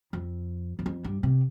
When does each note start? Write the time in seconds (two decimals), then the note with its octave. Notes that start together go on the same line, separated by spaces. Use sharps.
0.13 F2
0.79 E2
0.86 F2
1.04 G2
1.23 C3